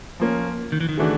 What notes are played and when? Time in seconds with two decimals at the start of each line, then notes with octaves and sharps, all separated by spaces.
0.20 F3 A#3 C#4
0.72 D#3
0.81 E3
0.89 D#3
0.97 C#3 E3 A3 D4 F#4